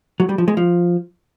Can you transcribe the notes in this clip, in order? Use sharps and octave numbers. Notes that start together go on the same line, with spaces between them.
F#3
G3
F3
G#3
F3